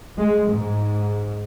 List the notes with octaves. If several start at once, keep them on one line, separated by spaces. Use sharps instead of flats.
G#3
G#2